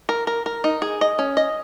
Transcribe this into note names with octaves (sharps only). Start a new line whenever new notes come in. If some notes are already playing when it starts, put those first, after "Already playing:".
A#4
A#4
A#4
D#4
G#4
D#5
C#4
D#5